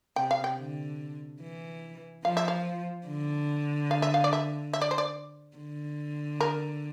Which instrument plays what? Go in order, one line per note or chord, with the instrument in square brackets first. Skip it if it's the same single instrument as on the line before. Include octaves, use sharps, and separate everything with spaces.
[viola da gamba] C3 [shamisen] G5
[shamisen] F5
G5
[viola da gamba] D3
E3
[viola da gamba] F3 [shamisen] F5
[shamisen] E5
F5
[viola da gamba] D3
[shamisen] F5
E5
F5
D5
E5
E5
D5
C5
D5
[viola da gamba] D3
[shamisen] A#4